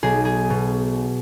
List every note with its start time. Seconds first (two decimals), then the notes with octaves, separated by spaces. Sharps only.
0.03 B1 G#4
0.25 G#4
0.50 B2